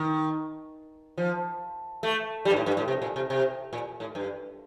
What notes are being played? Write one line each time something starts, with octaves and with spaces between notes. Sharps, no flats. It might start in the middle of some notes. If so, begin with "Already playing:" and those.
Already playing: D#3
F3
A3
G3
G2
A2
G2
A2
C3
A#2
C3
C3
A#2
A2
G2